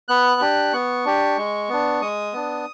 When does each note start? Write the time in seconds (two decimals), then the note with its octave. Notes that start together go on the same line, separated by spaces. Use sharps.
0.09 B3 F#6
0.41 D4 G4
0.73 B3 C#6
1.05 D4 G4
1.37 G#3
1.69 B3 D4
2.01 G#3 D#6
2.33 B3 D4